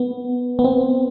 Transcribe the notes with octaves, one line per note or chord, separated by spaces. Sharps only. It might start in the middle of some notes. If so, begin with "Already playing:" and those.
Already playing: B3
B3
C4